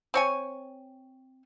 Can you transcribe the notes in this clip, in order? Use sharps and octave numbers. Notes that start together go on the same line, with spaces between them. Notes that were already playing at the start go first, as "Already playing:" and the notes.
C4 C#5 G#5